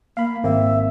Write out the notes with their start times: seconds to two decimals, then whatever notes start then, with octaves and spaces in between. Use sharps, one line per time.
0.17 A#3 F5 B5
0.44 G#1 A#3 C4 E5